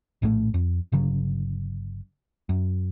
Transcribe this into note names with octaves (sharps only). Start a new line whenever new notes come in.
A#1 A2 D3 A3
F2
G1 C#3 F#3
F#2